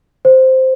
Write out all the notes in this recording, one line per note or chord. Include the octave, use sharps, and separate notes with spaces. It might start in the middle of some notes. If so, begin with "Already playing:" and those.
C5